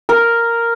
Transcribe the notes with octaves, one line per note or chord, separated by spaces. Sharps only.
A#4